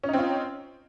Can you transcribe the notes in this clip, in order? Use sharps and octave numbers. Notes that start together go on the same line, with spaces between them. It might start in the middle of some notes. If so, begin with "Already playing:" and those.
C4 C#4 D#4 F4